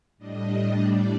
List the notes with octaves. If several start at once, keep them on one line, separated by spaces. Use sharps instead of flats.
A2 G3 D4 D#5
D5